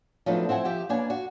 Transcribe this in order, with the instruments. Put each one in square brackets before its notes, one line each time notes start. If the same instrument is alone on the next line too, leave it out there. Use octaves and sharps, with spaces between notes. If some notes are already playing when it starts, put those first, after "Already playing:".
[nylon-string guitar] F3 F#3 A3 B3 D4 D#4
C4 E4 F#5 G#5
F3 G4 E5
A#3 B3 D4 C#5 G#5
F#4